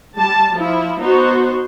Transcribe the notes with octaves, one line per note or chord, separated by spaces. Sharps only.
G3 A5
F3 E4
B3 D#4 F#4 C5